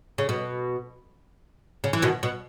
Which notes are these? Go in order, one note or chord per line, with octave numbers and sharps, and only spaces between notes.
C#3
B2
C#3
E3
B2 D#3
B2